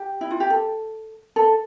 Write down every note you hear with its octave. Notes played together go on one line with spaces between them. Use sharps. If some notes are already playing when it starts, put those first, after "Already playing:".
Already playing: G4
E4
F4
G4
A4
A4